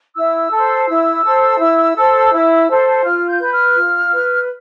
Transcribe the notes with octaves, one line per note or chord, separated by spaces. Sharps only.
E4 E6
A4 C5
E4 E6
A4 C5
E4
A4 C5
E4
A4 C5
F4 F6
G6
B4
F6
F4
B4